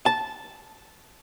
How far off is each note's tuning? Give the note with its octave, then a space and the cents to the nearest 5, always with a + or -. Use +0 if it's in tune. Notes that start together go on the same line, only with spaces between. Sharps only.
A5 -10